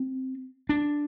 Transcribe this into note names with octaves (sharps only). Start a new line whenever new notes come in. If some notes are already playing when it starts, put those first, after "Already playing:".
Already playing: C4
D4